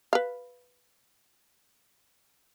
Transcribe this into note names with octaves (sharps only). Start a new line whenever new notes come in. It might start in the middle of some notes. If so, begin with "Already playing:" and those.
B4 F5